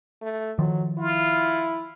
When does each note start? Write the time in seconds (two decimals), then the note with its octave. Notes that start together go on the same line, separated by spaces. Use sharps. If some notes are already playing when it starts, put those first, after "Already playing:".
0.22 A3
0.59 D#3 F3 F#3
0.98 E4 F4